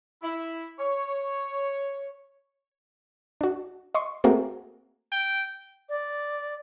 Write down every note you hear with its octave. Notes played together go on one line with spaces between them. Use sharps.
E4
C#5
D4 F#4
D#5 C6 C#6
A3 A#3 C4 F#4 G#4 A#4
G5
D5